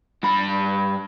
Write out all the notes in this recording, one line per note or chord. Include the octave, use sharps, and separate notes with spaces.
G2 B5